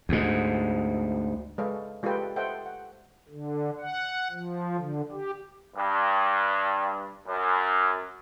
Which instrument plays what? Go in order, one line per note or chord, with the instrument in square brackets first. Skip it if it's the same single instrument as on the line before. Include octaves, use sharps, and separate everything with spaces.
[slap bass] D2 G#2
[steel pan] G#3 A4 B4 C#5 F5
G#3 F4 G4 A4 B4 G5
A4 C5 D#5 E5 F#5 G5
F#5
[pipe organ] D3
F#5
F3
D3
G4
[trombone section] G2
F#2